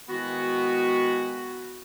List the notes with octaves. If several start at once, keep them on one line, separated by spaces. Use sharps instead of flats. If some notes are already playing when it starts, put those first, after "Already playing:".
D#3 G#3 B3 E4 F#4